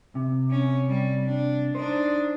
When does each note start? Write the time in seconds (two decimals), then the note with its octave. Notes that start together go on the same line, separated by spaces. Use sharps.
0.15 C3
0.51 C#4
0.89 G3
1.25 D4
1.75 D4 D#4 C5